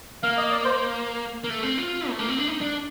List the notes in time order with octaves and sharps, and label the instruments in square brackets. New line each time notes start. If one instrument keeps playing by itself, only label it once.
[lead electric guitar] A#3 [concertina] F5
[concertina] D#5
D5
C5
[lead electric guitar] A#3
A3
C4
F4
A3
A#3
C4
D4
D#4
D4